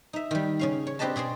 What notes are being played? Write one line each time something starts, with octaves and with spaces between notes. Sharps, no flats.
D#4 E5
D#3 G3
C#3 C#4 F5
C#5
C4 D4 G4 B4 D#5 A5
B2 G#4 D5 C6